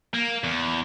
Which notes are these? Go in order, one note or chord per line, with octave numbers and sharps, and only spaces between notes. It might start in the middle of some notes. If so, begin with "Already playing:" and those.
A#3
E2